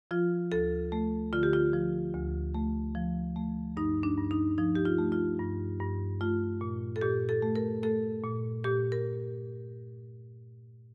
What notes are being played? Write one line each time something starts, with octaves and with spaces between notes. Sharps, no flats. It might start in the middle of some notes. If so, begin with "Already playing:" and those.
F3 F4
D2 A4
A3
D3 F4
G4
F4
F3
D2
A3
F3
A3
G2 D#4
D4
G2
D#4
F3 D#4
G4
F4
A3
F4
G2
G2
A3 F4
A#2
A4
A#2 G4
A4
A3
A#4
A3 A4
A#2
A#2 G4
A#4